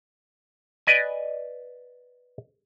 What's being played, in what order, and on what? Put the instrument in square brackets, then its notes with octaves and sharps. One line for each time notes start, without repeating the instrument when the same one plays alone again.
[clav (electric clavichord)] B4 D5 D#5 G#5